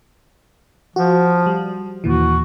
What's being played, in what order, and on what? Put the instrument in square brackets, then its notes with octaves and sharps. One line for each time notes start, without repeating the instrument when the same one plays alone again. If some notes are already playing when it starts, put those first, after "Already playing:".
[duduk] F3 [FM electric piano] F#4
[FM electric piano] G3
[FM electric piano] D#2 A#2 E3 [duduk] F#4